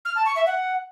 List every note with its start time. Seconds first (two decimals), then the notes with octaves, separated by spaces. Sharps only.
0.05 F6
0.15 A5
0.26 C#6
0.36 E5
0.46 F#5